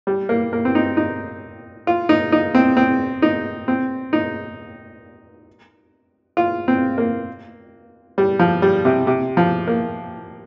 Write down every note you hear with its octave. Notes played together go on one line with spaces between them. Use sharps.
G3
A#3
A#3
C4
D#4
D#4
F4
D#4
D#4
C4
C4
D#4
C4
D#4
F4
C4
A#3
G3
F3
G3
C3
C3
F3
A#3